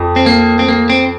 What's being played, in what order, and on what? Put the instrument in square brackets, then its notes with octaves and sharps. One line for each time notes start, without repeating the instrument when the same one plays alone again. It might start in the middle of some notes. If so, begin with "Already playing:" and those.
Already playing: [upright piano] F2
[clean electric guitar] C4
A#3
C4
A#3
C4